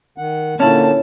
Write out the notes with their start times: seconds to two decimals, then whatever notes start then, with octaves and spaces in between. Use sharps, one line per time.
0.18 D#3 F#5
0.60 A#2 D3 A#3 C#4 E4 A5